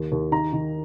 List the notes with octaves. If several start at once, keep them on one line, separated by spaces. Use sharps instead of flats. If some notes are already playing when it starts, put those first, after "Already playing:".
Already playing: D#2
D#2
D#3 A#5
D#3